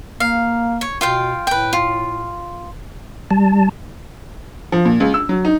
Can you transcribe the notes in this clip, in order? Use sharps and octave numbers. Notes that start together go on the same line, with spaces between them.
A#3 F5
C#5
B2 F4 F5 G5
A2 B4 G5
F4
G3 A5
F3
A#2
C#2
E6
F#3
D#4